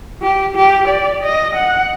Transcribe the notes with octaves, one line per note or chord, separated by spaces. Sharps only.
G4
G4
D5
D#5
F#5